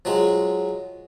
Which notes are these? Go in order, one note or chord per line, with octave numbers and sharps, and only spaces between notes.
F3 F#3 G#3